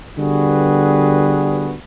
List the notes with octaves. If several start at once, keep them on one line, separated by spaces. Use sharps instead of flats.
D3 G3 B3 F#4 G#4 B4